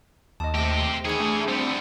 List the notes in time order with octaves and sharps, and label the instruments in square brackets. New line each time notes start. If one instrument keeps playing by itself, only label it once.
[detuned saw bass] D#2 [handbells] D#5 A5
[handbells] A3 E6 A#6 [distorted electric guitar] C4 G4
[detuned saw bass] D#3 [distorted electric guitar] E3 G#4 [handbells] G#6 C#7
[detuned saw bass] A3 [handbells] D4
[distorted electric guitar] G3 B3 [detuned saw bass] C4